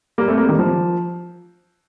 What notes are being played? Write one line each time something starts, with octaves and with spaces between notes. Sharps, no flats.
G3 A#3
A3 C4
G3 A#3
D#3 G3
F3